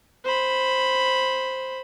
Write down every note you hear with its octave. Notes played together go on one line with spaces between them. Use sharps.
C5 B5